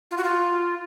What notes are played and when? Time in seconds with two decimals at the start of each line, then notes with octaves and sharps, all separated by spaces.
0.11 F4
0.17 F#4
0.24 F4